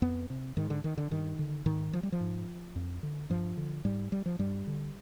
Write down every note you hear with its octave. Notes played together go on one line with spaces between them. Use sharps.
F2 B3
C3
G#2 D#3
D3
D#3
D3
G2 D#3
D3
G#2 D#3
F3
G3
F3
G#2
F2
D3
G2 F3
D3
G#2 G3
G3
F3
G2 G3
D3